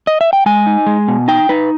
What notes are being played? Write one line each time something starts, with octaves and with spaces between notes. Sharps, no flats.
D#5
E5
G5
G#3 G#5
D#4
G#3
B2
D#4 G5
D#4 B4